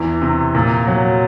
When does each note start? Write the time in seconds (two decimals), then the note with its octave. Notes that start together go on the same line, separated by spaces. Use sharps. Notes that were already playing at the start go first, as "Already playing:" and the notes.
Already playing: E2 E3
0.22 C3
0.55 A#2
0.87 F#3